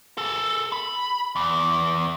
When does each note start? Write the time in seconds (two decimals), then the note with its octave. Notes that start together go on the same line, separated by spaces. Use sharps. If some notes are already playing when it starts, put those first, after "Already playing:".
0.17 G#4 A4
0.72 B5
1.36 E2